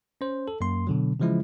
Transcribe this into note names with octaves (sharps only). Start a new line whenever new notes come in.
C#4 C5
A4
F#2 A#3 C6
B2 D3 F#3
C#3 E3 F3 G#3 E4